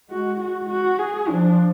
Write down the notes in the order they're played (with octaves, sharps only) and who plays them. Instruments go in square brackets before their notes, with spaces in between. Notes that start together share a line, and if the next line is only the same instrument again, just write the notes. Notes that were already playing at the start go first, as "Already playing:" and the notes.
[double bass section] G#3 [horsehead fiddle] F#4
[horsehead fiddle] F#4
F#4
G#4
[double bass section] F3 [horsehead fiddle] D4